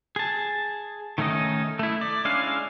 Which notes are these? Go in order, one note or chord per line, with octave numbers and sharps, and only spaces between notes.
G#4 A5
D#3 A3 C#4 D#4 D#5
A3 E4
D5
G#3 C#4 D4 E4 F5